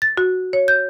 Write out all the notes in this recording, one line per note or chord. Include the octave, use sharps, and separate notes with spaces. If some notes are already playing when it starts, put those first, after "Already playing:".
A6
F#4
C#5
G6